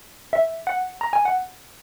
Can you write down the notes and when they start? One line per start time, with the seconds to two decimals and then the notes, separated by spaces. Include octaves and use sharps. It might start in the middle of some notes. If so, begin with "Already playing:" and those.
0.33 E5
0.67 F#5
1.01 A#5
1.13 G#5
1.25 F#5